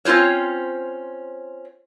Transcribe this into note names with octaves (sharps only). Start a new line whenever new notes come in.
C4 C#4 F4 C5 C#5